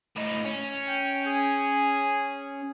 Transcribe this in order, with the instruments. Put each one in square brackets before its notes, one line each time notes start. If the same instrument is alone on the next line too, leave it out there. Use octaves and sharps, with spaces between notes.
[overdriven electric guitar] A2 D#4
C#4
[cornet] G5
G#4